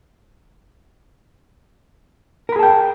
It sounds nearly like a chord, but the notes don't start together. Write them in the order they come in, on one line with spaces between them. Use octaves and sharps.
A#4 B5 G#4 A5 G5